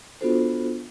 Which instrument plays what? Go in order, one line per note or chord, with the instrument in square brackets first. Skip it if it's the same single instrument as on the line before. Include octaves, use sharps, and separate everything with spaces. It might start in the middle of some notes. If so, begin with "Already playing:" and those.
[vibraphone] B3 D4 F4 F#4 A4 C5